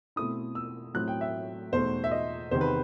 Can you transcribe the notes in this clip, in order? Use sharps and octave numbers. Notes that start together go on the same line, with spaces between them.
B2 A3 C4 E4 D#6
E6
A2 F#3 C4 E4 F#6
G5
E5
E2 B2 A3 D#4 C5
E5
D#5
E2 C3 D#3 C5
B4